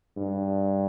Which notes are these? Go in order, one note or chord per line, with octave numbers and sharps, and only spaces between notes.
G2